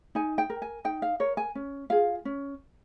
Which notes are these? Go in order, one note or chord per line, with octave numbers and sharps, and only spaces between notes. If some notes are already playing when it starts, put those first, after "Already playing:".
D#4 G#5
G5
A#4
G#5
D#4 G5
F5
A#4 C#5
G#5
C#4
F4 G#4 F5
C#4